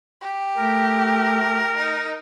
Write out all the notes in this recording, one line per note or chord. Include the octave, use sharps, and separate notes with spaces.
G4
A3 A#4
D#4